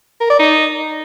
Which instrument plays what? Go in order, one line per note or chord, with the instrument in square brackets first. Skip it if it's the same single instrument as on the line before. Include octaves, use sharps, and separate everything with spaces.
[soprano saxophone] A#4
D5
D#4